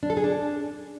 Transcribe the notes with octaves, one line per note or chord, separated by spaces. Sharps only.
D4
A4
G#4
D4